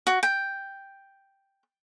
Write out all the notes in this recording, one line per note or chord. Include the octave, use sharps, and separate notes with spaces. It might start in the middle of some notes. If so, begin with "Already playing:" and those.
F#4
G5